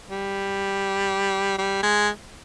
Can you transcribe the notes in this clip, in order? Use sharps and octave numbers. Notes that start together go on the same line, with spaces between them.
G3
G3
G#3